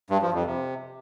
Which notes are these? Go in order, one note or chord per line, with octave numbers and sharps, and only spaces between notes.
G2
F3
F2
C3